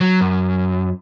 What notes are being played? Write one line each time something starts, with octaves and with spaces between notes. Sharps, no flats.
F#3
F#2